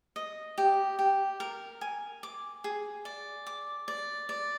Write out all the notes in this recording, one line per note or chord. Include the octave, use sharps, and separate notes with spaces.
D#5
G4
G4
A#4
G#5
D6
G#4
D5
D6
D5
D5